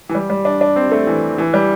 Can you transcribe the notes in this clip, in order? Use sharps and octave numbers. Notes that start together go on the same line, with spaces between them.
E3
G3
G3
D4
D4
C4
A3
E3
E3
G3